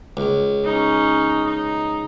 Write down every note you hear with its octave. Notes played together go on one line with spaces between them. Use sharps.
C#2
C#4 D#4
D#4